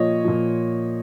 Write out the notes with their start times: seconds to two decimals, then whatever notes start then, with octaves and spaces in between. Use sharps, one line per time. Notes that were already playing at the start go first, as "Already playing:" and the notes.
Already playing: A#2 F3 C#5 D#5
0.24 A#2 F3